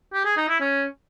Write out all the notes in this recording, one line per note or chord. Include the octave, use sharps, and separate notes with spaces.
G4
G#4
D#4
E4
C#4